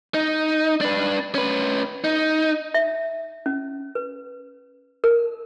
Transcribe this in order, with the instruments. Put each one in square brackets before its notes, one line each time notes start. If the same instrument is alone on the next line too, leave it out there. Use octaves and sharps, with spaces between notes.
[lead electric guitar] D#4
D4 B4
C#4 B4
D#4
[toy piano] E5
C#4
B4
A#4